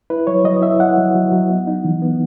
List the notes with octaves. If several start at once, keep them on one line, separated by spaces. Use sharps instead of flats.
E4 B4
F#3 C#5
F#3 D#5
E4 E5
E4 F#5
F#3
F#3
F#3
B3
D#4
E3
B3